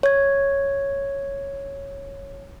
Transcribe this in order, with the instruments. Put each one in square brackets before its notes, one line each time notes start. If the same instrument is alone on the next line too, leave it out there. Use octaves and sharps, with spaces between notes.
[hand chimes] C#5 G#6